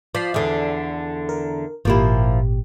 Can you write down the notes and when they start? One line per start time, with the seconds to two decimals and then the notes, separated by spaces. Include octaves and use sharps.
0.15 F3 D5 B6 C7
0.34 E2 D3
1.29 A#4
1.85 G#1 A#2 F3 A#3 E4 G4